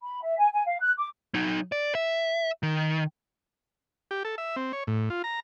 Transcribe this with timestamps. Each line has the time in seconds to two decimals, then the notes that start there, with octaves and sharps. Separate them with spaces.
0.02 B5
0.22 E5
0.38 G#5
0.52 G#5
0.66 F5
0.81 F#6
0.98 D6
1.34 F#3 D#4
1.72 D5
1.95 E5
2.63 D#3
4.11 G4
4.25 A4
4.38 E5
4.56 C4
4.73 C#5
4.87 A2
5.10 F4
5.24 A#5